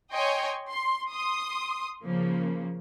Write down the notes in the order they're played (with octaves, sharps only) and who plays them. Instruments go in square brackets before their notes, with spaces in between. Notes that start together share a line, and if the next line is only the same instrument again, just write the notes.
[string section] C#5 D#5 G5 G#5 C6 C#6
C6
C6 D#6
C#3 F3 A#3